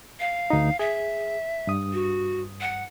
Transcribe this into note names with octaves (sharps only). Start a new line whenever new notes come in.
F5
D2 D#4
G#4 E5
G2 D#6
F#4
F#5